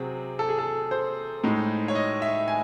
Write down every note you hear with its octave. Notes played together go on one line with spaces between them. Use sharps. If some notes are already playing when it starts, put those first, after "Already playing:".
Already playing: C3 F#3 C4 G#4
A4
G#4
A4
C5
A2 G#3 D#4
C#5
D#5
E5
G#5